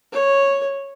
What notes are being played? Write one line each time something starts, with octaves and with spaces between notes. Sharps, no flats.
C#5